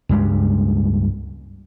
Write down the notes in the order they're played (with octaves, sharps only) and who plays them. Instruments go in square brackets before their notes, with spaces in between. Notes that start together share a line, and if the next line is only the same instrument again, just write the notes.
[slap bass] C#2 G2 G3 G#3